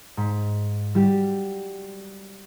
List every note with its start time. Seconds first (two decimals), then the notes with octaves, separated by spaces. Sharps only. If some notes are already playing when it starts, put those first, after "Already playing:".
0.17 G#2 B6
0.95 G3 F#4 G4